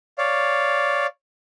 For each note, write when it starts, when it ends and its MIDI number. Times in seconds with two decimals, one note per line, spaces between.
0.18 1.07 73
0.18 1.07 74
0.18 1.07 77